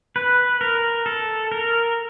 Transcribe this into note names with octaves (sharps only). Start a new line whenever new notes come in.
B4
A#4
A4
A#4